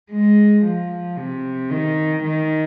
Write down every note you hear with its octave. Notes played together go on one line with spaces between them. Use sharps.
G#3
F3
C3
D#3
D#3